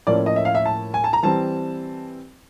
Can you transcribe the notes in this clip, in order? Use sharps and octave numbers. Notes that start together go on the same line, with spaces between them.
A2 F3 A#3 C#4 D5
D#5
E5
F5
E5
A5
G#5
A5
A#5
E3 G3 C4 A5